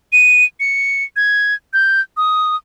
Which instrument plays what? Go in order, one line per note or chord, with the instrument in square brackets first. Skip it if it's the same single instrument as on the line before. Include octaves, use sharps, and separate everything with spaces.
[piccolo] D#7
C#7
G#6
G6
D#6